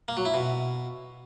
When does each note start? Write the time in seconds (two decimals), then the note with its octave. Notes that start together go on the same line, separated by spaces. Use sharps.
0.08 A#3
0.17 F#3
0.25 E4
0.34 B2